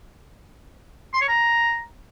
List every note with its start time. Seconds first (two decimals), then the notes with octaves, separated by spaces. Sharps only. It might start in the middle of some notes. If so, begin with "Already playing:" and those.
1.14 C6
1.21 C#5
1.29 A#5